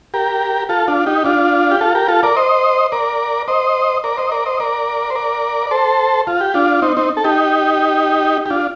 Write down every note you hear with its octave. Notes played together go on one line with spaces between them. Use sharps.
G4 A#4
F4 A4
D4 F4
D#4 G4
D4 F4
G4
F4 A4
G4 A#4
F4 A4
A#4 D5
C5 D#5
A#4 D5
C5 D#5
A#4 D5
C5 D#5
A#4 D5
C5 D#5
A#4 D5
C5
A#4 D5
D5
A4 C5
F4
G4
D4 F4
C4 D#4
C4 D#4
A4
D#4 G4
G4
D4 F4